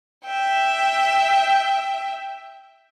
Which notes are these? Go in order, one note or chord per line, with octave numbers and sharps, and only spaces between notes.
E5 G5